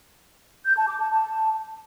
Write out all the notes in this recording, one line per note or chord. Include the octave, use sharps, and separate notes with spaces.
G6
A5
D6
A5
A5